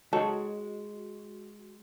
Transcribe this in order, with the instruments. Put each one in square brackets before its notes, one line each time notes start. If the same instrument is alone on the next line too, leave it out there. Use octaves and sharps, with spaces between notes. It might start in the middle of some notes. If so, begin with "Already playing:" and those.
[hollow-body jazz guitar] G#3 C#5 [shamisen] D#4 A4 [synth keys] F#4